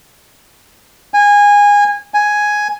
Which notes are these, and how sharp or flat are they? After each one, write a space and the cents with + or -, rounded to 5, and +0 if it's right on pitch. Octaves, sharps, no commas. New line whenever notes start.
G#5 -20
G#5 +5